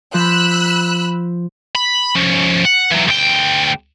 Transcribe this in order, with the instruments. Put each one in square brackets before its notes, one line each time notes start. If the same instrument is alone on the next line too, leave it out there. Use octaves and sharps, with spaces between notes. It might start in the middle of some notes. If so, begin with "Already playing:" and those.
[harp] F3 [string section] B5 E6 F#6
[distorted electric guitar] B5
F3 C#4
F#5
E3 F#3
D2 G5